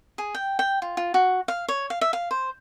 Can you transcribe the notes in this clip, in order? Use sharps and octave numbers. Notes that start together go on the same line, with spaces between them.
G#4
G5
G5
F4
F4
F#4
F5
C#5
F5
E5
F5
C5